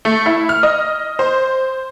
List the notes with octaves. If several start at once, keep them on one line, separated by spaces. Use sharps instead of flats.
A3
E4
F6
D#5
C5